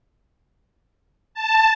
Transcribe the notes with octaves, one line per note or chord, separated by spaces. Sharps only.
A5